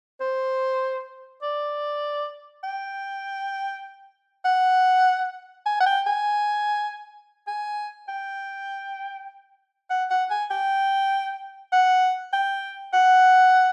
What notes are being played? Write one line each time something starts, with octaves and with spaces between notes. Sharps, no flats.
C5
D5
G5
F#5
G#5
F#5
G5
G#5
G#5
G5
F#5
F#5
G#5
G5
F#5
G5
F#5